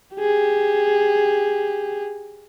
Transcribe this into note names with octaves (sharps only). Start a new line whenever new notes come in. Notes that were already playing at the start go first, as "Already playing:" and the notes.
G4 G#4